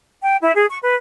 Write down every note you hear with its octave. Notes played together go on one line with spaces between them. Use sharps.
G5
E4
G#4
C#6
B4